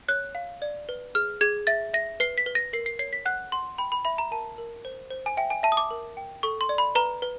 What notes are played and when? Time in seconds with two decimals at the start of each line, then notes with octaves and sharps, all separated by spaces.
0.08 C#5 F#6
0.35 F5
0.62 D5
0.89 B4
1.15 G#4 F6
1.41 G#4 G#6
1.67 E5 A6
1.93 E5 A#6
2.20 B4 C7
2.38 B6
2.46 B4
2.55 A#6
2.73 A#4 C7
2.86 C7
2.99 C#5 C7
3.13 B6
3.26 F#5 F#6
3.52 F#5 C6
3.78 G5 B5
3.92 B5
4.05 E5 B5
4.18 A#5
4.31 A#4 A5
4.58 A#4
4.85 C5
5.11 C5
5.26 G#5
5.37 E5 G5
5.50 G#5
5.63 E5 A5
5.72 D#6
5.77 D6
5.91 A#4
6.17 G5
6.43 A4 C#6
6.61 C6
6.69 D5
6.78 B5
6.95 B4 A#5
7.22 B4